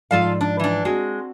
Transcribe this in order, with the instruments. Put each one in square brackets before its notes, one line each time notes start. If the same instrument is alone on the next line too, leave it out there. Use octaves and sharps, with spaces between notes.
[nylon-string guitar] G#2 F3 D5 [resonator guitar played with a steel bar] F4 A4 F5
[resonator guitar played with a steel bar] D4
E3 D4
[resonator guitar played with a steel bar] G#3 [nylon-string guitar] C4 F#4